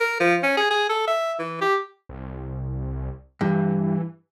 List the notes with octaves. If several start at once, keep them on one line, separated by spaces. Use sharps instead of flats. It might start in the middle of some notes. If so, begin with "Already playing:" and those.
A#4
F3
C#4
G#4
G#4
A4
E5
E3
G4
C2
G2 E3